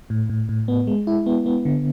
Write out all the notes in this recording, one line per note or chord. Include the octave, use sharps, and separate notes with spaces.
A2
A2
A2
B3
G#3
E4
B3
B3
D3